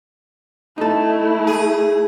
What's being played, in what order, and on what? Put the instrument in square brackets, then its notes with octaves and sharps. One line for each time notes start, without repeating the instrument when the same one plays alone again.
[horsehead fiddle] A3 E4 [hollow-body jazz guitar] D#4 A4
[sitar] G#4